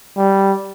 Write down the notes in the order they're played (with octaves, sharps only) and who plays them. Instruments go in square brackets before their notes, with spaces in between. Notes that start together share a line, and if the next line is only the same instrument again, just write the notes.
[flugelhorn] G3